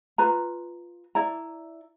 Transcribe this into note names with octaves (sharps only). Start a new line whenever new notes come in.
F4 B4 A#5
E4 D5 A#5